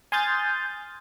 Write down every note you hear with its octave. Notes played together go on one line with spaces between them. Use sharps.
G#5 C6 D#6 F6 G6 A6